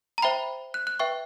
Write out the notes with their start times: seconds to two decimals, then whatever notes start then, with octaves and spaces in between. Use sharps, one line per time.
0.18 A#5
0.22 C5 E5 G5 B5
0.74 F#6
0.87 F#6
0.99 B4 E5 G5 C#6